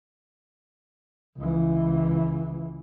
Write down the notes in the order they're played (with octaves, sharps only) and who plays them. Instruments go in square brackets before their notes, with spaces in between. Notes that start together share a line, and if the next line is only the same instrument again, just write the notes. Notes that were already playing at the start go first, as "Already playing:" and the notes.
[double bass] C#2 E3